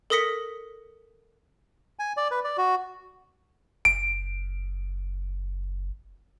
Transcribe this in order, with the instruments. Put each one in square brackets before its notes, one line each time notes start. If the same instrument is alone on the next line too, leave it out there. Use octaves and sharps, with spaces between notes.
[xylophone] A4 A#4 D#6 A#6 B6 C#7
[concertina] G#5
D5
B4
D5
F#4
[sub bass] F#1 [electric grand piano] D7